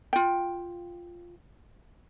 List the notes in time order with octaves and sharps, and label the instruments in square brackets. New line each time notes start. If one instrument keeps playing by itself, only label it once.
[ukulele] F4 G5